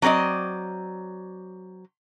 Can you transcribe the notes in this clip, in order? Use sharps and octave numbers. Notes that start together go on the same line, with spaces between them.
F#3 C4 A#4 D5 D#5